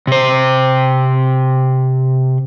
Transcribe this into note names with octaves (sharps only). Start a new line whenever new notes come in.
C3 C5